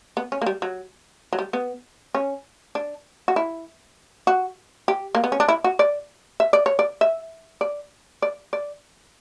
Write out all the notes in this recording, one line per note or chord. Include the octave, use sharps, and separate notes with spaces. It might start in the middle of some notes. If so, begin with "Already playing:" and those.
B3
C#4
A#3
G3
F#3
F#3
G3
B3
C#4
D4
F#4
E4
F#4
G4
A#3
B3
C#4
D4
E4
F#4
D5
E5
D5
C#5
D5
E5
D5
D5
D5